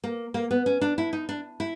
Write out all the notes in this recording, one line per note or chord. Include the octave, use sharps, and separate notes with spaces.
A#3
A#3
B3
C#4
D4
E4
D#4
D4
E4